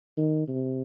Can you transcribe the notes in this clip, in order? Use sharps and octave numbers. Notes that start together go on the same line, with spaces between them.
D#3
C3